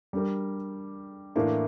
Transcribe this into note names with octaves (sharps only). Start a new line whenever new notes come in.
G3 D4 G4 A#4
A2 E3 A#3 D4